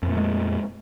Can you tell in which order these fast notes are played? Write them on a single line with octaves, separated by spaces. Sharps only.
F2 A#2 A3 G#3